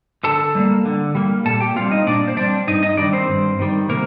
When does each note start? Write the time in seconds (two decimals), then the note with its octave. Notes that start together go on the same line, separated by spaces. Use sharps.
0.24 D3 A4 A5
0.55 G3 A#3
0.85 D3
1.15 G3 A#3
1.45 A#2 A4 A5
1.61 G4 G5
1.76 G3 C4 F4 F5
1.91 D#4 D#5
2.07 A#2 D4 D5
2.28 C5
2.37 G3 C4 D4 D5
2.67 G2 D#4 D#5
2.82 D#4 D#5
2.97 D#3 G3 D4 D5
3.13 C4 C5
3.28 G2
3.59 D#3 G3
3.89 C3 A#3 A#4